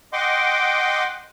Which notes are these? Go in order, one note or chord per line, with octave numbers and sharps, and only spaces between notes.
D#5 F#5 G5 C6 D6